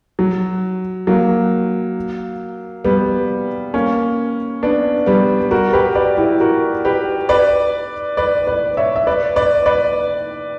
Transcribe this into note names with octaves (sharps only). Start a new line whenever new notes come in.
F#3
F#3 A#3
G3 B3
A#3 C#4
B3 D4
G3 B3
F#4 A#4
G4 B4
B4 D5
E4 G4
F#4 A#4
G4 B4
B4 D5
B4 D5
B4 D5
C#5 E5
E5
B4 D5
B4 D5
B4 D5